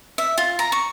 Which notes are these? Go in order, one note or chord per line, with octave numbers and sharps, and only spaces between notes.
E5
F4
A#5
C#6